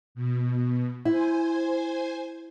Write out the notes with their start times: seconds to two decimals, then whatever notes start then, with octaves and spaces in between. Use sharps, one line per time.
0.15 B2
1.05 E4 C5 G#5